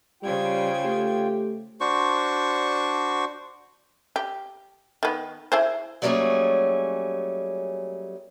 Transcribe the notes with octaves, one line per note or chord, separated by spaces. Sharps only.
C#3 G3 F4 C5 G5 G#6
A3 G4
D4 F#4 C5 C#6
G4
D#3 B3
E4 G#4 C5
F#3 G3 A3 A#3 C#4 G#4